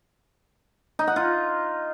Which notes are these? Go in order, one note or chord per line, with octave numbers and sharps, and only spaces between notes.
D#4
F#5
F4